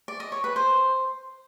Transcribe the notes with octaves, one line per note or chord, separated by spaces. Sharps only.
D5
D#5
C#5
B4
C5